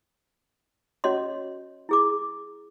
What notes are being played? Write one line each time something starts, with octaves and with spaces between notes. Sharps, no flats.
C#4 F#4 C#5 D#5 C6
E4 G#4 D6